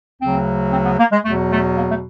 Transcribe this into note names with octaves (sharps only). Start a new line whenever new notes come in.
D2 C#3 F#3 C4
C4
B3
A#3
G#3
E2 B2 F#3 A3
A3
A#3
A3